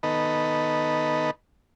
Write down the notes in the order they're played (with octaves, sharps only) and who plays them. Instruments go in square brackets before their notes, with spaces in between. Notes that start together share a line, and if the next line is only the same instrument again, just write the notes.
[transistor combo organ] D#3 B3 D#4 A4 B4